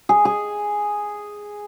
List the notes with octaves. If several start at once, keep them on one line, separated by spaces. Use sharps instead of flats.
G#4
G#4